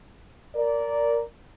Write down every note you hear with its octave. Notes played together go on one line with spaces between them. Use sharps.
A#4 D5